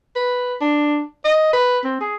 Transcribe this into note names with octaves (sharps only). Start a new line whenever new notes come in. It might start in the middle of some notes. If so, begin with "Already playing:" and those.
B4
D4
D#5
B4
C4
G#4